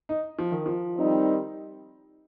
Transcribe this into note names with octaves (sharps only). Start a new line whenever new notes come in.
D#4
F3
D#3
F3
D#3 G3 C4 D#4